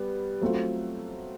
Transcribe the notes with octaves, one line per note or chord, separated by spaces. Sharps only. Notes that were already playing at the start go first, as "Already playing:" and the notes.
Already playing: G3 B3
F#3 A3 C4 F4